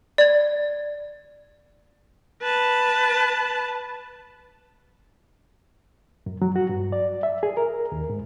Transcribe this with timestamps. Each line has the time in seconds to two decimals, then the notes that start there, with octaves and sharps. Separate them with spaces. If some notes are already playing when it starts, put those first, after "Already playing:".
0.18 D5 G#6
2.42 B4 A5
6.26 F#2
6.42 F#3
6.56 F#4
6.69 G2
6.92 D5
7.23 E5
7.43 G#4
7.57 A#4
7.92 D#2
8.10 G#2